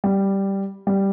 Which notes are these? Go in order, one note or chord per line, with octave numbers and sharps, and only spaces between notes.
G3
G3